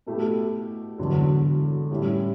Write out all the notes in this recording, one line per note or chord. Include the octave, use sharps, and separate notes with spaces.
B2 A3 E4 G4
E1 E2 D3 F#3
A2 G3 C#4 E4